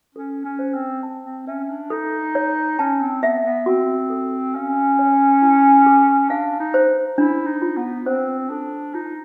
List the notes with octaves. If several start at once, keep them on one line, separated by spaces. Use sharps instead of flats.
C#4 A4
C#4
C5
C4
A5
C4
C#4 E5
D4
D#4 A4
C#5
C#4 A5
C4
B3 E5
B3
C4 F#4
A4
C#4 F5
C#5
E4
G#4
D4 F5
D#4
C5
D4 E4
D#4
F4
B3
C4 C5
D4 A4
D#4 F4